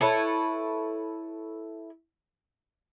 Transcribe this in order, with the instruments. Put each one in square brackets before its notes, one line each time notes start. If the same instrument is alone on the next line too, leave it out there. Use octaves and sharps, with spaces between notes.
[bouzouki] E4 A4 B4 C#5